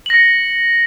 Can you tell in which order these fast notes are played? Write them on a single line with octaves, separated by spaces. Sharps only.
F#7 A#6 C#7